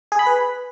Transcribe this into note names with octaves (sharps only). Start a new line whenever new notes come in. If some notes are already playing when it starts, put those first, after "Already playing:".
G#4
B5
B4